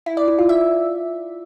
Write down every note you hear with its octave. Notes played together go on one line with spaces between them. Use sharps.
E4
D5
E4
F4
E5